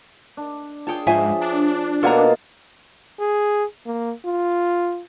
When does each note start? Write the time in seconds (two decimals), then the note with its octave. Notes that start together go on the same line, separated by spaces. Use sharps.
0.37 D4
0.87 F4 G#4 C#5 G5 A5
1.07 G#2 F3 C5 C#5 E5 G#5
1.41 D4
2.03 B2 A#3 D#4 F4 A4 F#5 G#5 A#5
3.20 G#4
3.86 A#3
4.26 F4